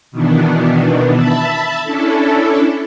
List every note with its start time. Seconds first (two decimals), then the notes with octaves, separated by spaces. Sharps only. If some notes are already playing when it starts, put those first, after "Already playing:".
0.12 B2 D#3 E3 B3 D4
1.13 E5 A5 B5
1.84 C#4 D4 E4 A4